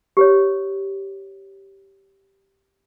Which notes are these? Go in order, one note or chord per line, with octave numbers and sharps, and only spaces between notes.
G4 B4 C#5